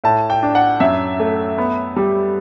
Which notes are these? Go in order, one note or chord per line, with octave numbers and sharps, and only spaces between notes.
A2 A5
G5
D4
F#5
F#2 E5
A3
B3
G3